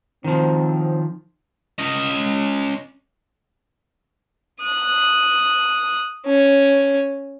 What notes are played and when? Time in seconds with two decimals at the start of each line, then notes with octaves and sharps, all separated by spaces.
0.24 D#3 F3 F#3 C4
1.78 C#4 D#5
4.62 D#6 F#6
6.26 C#4